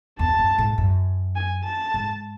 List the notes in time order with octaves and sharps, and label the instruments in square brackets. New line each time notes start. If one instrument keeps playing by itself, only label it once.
[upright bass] E2 [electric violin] A5
[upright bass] F#2
G#2
F#2
[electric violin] G#5
A5
[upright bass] G#2